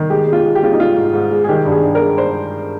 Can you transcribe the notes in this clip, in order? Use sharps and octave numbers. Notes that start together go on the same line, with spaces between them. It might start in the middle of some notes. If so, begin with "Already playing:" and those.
Already playing: D#3
G#3 G4
G#3
F4
G#3
G4
G#3 F4
D#4
G#3 F4
G#2
G#2
G#3
G#4
D#3 G4
G2
G#4
G2
A#4
G#3
C5